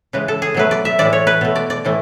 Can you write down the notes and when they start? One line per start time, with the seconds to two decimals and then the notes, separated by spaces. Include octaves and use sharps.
0.13 C#3 E3 G#3 B4
0.28 A4
0.42 G#4
0.54 B2 F#3 A3 B4
0.71 D5
0.85 E5
0.99 A2 E3 G#3 D5
1.13 C#5
1.27 B4
1.41 B2 A3
1.56 D5
1.70 D5
1.85 A2 E3 A3